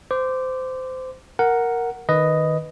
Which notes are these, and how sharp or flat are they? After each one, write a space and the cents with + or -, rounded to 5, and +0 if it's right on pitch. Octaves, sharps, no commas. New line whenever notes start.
C5 -20 D6 +0
A#4 +0 F#5 +0
D#3 -5 B4 +5 D#5 +0